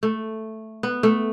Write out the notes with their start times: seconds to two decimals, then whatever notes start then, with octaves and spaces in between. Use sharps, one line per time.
0.03 A3
0.83 B3
1.03 A3